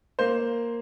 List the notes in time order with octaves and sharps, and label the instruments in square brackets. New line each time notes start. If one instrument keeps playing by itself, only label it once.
[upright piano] A#3 C5